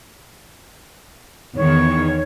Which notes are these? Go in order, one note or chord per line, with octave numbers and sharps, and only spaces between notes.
E2 D#3 C#5